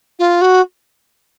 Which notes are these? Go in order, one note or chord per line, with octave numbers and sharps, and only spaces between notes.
F4
F#4